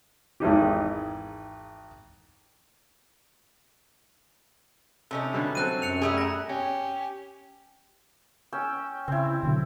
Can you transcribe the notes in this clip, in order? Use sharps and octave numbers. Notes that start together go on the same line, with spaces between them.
G#1 E2 D#4 G4
C3 C#4 D#4 A4
B2 D3 G3
F#3 C4 A4 F#6 D#7
F#2 F#6 C#7 F7
G3 A3 G#4
A#5 A#6
C#4 G4
C#4 G5 E6
C#3 C4 E4
B2 D3 F#3